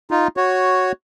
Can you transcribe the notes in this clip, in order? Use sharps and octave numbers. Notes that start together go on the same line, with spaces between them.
D#4 F4
F#4 C#5